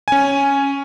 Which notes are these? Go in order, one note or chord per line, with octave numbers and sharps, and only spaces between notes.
C#4 G#5